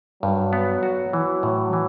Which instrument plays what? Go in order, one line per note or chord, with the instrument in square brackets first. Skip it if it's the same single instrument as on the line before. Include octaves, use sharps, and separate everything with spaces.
[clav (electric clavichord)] G2 [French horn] F#3
[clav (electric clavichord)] B3
F#4
E3
A2
E3